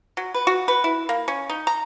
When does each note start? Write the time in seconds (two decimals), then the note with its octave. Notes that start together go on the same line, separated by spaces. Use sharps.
0.17 F#3
0.34 B4
0.47 F#4
0.68 B4
0.84 E4
1.09 A#3
1.28 C#4
1.50 D#4
1.67 A#5